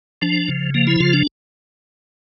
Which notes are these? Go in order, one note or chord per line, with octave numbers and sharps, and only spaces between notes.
F3 D4
C#3
F3 A#3
E4
C#3 F4
D4